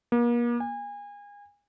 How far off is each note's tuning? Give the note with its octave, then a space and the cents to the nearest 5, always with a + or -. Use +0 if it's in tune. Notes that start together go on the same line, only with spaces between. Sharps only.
A#3 +40
G#5 -30